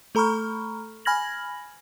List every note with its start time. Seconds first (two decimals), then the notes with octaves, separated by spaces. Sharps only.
0.15 A3 A4 A#5 B5 C#6 F6
1.05 G#5 B5 F6 G#6 A#6 F#7